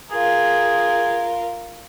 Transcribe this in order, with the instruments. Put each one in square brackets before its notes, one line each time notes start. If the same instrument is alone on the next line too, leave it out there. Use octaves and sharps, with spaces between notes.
[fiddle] F4 A#4 [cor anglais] G#4